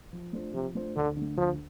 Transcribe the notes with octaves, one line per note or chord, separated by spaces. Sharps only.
F3
A3 D4 F4 C5
C3 F3
A3 D4 F4 C5
D2 D3
D3 A3
D2 F3